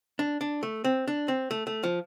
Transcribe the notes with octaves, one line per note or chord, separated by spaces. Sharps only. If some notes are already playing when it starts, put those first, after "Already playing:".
D4
D4
A3
C4
D4
C4
A3
A3
F3